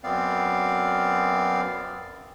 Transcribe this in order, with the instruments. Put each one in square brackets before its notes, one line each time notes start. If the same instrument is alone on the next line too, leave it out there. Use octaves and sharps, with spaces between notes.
[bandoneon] F#2 B3 C4 D5 F5